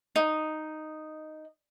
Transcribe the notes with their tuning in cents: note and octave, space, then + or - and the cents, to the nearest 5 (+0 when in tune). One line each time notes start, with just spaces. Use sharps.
D#4 -5